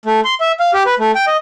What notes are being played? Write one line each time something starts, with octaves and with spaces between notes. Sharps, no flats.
A3
C6
E5
F5
G4
B4
A3
G5
D#5